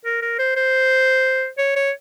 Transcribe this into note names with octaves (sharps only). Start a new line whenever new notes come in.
A#4
A#4
C5
C5
C#5
C#5